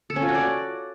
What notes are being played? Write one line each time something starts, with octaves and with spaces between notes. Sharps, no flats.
A4
C#4
F4
F#4
D5